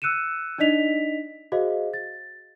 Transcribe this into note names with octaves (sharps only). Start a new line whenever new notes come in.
E6 F#6 C#7 D#7 E7
D4 D#4 D5 D#5 B6 F7
F#4 G#4 C5 D#5 F5
A6